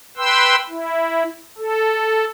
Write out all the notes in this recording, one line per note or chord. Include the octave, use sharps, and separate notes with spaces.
B4 G5 C6 E6
E4
A4